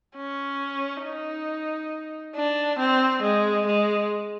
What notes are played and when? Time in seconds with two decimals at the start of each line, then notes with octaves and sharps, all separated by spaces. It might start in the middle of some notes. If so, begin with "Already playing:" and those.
0.17 C#4
1.03 D#4
2.36 D4
2.79 C4
3.23 G#3
3.67 G#3